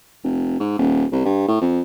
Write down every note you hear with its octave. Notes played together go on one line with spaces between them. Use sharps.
F1
G#2
D#1
C2
G2
A2
F2